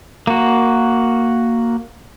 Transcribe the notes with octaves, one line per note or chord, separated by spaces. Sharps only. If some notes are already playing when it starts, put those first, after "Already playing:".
A#3 F#4